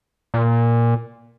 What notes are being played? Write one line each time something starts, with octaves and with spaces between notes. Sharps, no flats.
A#2